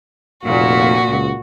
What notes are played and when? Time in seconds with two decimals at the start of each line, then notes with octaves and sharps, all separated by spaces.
0.44 F1 A#2 F#4
1.08 C#2